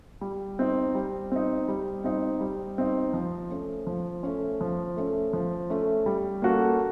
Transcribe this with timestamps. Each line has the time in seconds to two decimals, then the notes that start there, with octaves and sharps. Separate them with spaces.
0.21 G3
0.59 C4 D#4
0.95 G3
1.32 C4 D#4
1.68 G3
2.04 C4 D#4
2.41 G3
2.78 C4 D#4
3.13 F3
3.51 A3 C#4
3.87 F3
4.23 A3 C#4
4.61 F3
4.97 A3 C#4
5.33 F3
5.70 A3 C#4
6.06 G3
6.42 A#3 C#4 F#4 A4